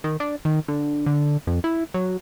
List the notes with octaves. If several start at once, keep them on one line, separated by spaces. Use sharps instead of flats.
D#3
D4
D#3
D3
D3
F2
E4
F#3